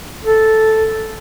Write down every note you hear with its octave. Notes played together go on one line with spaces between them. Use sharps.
A4